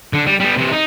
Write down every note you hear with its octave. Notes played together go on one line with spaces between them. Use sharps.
D3
G3
G3 B3
C3 E3
D#4